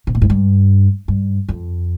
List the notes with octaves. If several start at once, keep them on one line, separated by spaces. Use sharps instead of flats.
C3
A#2
G#2
G2
G2
F2